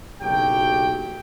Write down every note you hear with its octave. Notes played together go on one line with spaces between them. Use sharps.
F#1 B1 F#3 G4 G5